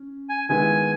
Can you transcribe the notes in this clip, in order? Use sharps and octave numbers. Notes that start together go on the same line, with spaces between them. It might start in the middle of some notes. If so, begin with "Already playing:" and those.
Already playing: C#4
G#5
D#3 G#3 B3 E4 G#4 G#5